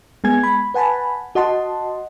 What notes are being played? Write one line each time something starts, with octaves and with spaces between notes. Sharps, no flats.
G#3 B3 G#5 G#6
B5
B4 F#5 G#5 A5 B5
F#4 D#5 F#5 A5 C6